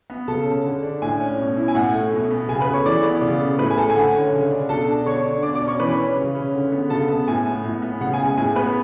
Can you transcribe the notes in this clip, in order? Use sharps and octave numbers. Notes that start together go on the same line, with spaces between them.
B3
C#3 A4 A5
C#4
D3
D4
A2 G#5
C#4
B2
E4
G#5
A2 F#5
A3
B2
B3
C#3 G#5
B4 B5
A3
C#5 C#6
E3 D5 D6
B3
C#3
A3
A2 B4 B5
G#5
A3 A4 A5
G#5
D3 F#5
C#4
C#3
D4
B2 A4 A5
D4
D3 C#5 C#6
D4
B2 D5 D6
D5 D6
C#4
C#5 C#6
E3 B4 B5
C#4
C#3
C#4
D3
B3
C#3 A4 A5
B3
A2 G#5
B3
A2
B3
C#3 F#5
G#5
G#3
G#5
A2 G#5
B3 B4 B5